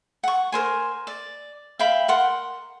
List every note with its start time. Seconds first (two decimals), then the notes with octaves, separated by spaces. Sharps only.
0.23 F#5 C#6
0.52 A#4 C5 G#5
1.07 D5
1.79 E5 F5 G5 B5
2.08 A#4 F#5 C6